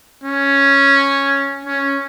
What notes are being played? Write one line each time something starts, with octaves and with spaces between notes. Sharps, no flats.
C#4
C#4